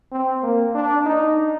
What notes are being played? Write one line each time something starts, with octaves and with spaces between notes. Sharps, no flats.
C4
A#3
D4
D#4